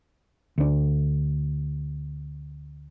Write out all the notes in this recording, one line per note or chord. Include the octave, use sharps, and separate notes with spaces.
D2 D4